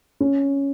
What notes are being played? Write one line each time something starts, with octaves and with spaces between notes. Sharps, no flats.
C#4